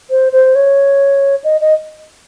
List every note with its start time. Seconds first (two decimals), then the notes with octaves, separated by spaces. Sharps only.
0.10 C5
0.32 C5
0.55 C#5
1.44 D#5
1.61 D#5